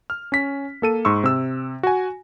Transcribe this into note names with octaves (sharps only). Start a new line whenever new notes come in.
F6
C#4 B6
A#3 A4 D#7
G#2 C6 C#6 E6
C3 E6
F#4 G#5